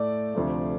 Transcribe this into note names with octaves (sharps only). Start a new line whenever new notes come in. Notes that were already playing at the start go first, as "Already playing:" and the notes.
Already playing: A2 A3 D5
D2 C3 F3 A3